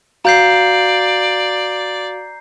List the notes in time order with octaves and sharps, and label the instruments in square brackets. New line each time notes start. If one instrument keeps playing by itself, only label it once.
[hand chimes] F#4 F5 [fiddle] D5 [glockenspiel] A#5 G6 C7